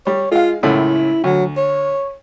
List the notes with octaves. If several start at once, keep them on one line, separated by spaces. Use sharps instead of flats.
G3 C#5
G#3 F4 F5
C#2 F#2 A2 E4
D2 F#3
C#5